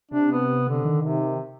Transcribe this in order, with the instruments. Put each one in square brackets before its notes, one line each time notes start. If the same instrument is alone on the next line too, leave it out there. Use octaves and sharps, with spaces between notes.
[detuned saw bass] C3 [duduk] D4
[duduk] B3
D3
[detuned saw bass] D#3
[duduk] C3